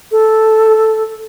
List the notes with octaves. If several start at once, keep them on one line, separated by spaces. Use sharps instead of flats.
A4